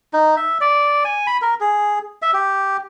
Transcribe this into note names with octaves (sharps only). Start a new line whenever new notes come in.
D#4
E5
D5
G#5
B5
A#4
G#4
E5
G4